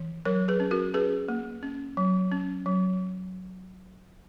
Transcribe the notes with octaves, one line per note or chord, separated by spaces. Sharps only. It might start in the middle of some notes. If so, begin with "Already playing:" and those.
Already playing: E3
F#3 A#4 C#5
G#4 B4
C#4
F#4 A#4
C#4 G#4 B4
A#3
C#4
F#3
C#4
F#3